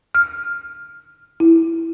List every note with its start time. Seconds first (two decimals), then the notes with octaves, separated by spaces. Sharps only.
0.15 F6
1.40 E4